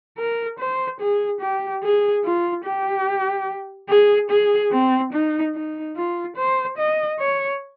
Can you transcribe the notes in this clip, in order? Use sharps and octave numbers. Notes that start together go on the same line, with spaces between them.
A#4
C5
G#4
G4
G#4
F4
G4
G#4
G#4
C4
D#4
D#4
F4
C5
D#5
C#5